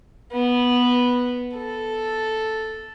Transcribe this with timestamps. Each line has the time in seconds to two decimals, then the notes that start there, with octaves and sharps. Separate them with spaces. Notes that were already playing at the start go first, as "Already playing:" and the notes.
0.32 B3
1.55 A4